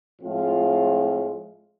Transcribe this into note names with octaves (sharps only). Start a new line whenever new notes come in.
A2 F3 G#3 C4 F4